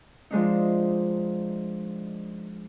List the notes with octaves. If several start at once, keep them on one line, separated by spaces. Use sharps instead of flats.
F3 G#3 D4 D#4